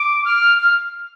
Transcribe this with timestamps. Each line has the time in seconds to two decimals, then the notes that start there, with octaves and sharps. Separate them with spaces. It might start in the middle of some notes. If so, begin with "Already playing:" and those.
Already playing: D6
0.25 F6
0.60 F6